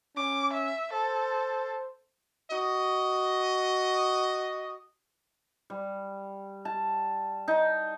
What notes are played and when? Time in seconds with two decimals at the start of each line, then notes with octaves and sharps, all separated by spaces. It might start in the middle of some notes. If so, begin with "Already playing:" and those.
0.16 C#4 D6
0.53 E5
0.93 A4 C5
2.51 F#4 D#5
5.70 G3
6.65 A5
7.48 D#4